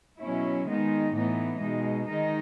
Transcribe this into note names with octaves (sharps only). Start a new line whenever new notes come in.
B2 F#3 C#4 E4
D#3 G#3 B3 D#4
A2 E3 B3 D#4
B2 G#3 D#4
D#3 G#3 D#4